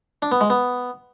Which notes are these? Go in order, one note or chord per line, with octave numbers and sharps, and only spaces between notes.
D4
B3
G#3
B3